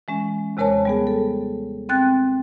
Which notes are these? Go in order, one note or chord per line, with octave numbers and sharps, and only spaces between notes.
E3 G#3 C#4
D#2 C3 G#3 A#4 C#5 A5
G3 B3 G#4
A4
C4 G5 F#6 A6